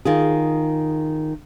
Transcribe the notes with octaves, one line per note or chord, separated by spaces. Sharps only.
D#3 F4 G#4